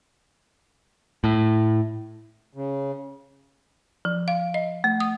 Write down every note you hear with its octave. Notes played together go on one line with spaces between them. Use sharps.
A2
C#3
F3
F5
D#5
A3
D#6